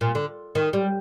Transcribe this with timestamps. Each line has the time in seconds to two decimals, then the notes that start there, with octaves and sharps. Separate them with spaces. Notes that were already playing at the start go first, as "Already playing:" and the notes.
0.01 A#2
0.15 D3
0.55 D#3
0.73 G3